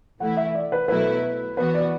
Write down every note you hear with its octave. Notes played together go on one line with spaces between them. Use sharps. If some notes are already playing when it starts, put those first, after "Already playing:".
E3 A3 E4 F#5
E5
D5
B4
B2 F#3 A3 E4 B4
E3 B3 F#4 B4
D5